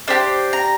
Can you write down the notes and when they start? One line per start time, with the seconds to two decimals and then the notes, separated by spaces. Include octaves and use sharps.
0.08 D4 G4 C5
0.53 A#5